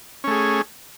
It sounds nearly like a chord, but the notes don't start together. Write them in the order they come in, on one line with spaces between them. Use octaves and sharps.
C#4 A3 G#4